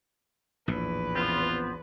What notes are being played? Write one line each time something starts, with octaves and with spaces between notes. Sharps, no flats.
A#1 E2 A2 B4
F3 B3 C4 F4